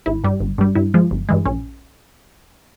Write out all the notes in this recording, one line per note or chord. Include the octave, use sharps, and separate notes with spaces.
G#1 E4
G2 G3
G1
G2 G3
G2 E4
F3 G#3
G1
G2 E3 G#3
A#1 C#4